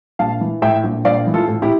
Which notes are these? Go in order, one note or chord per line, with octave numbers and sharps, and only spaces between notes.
A#1 F5 A5
E3
A2 E5 G5
A#1
A#1 D5 F5
E3
F4 A4
A2
E4 G4